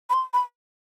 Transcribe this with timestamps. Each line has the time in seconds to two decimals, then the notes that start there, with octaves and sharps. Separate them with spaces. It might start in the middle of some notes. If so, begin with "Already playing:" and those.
0.10 B5
0.13 C6
0.33 B5